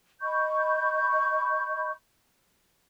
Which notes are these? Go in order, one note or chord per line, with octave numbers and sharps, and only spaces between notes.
D#5 B5 C#6 G6